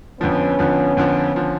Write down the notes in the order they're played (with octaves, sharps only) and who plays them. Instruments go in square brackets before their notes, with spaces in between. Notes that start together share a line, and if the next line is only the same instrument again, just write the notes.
[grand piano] F2 D3 F3 [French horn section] B3 C#4
[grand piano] F2 D3 F3
F2 D3 F3
D3 F3